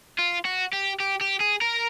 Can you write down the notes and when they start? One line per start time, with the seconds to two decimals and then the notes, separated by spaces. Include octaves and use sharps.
0.19 F4
0.45 F#4
0.73 G4
1.00 G4
1.21 G4
1.40 G#4
1.61 A#4